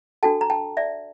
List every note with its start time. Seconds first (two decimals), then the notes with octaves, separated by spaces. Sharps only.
0.23 D4 F#4 A4 G5 A5
0.41 A#5
0.50 G5 A5
0.77 D5 E5